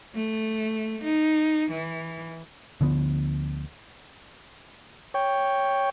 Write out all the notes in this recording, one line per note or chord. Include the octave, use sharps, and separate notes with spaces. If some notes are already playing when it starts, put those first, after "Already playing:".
A3
D#4
E3
D2 D3 F3 B3
C#5 G5